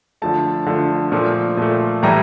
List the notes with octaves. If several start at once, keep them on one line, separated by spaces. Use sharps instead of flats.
D3 F3 A3 A5
D3 F3 A3
A#2 F3 A3
A#2 F3 A3
A2 E3 G3 A#5